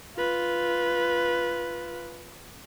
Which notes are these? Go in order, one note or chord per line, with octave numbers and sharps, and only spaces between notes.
F4 B4